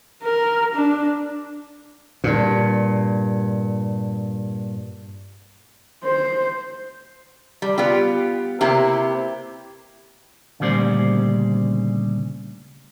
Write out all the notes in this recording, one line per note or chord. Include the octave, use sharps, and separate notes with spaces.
A#4
D4
G2 A#2
C5
G3
B3 F4 G4
C3 A#3 C4 E4 G4
D2 A#2 C#3 G3 C5 D5